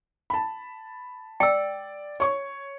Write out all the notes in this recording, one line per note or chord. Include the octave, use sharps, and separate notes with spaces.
A5 B5
D5 G5 E6
C#5 C#6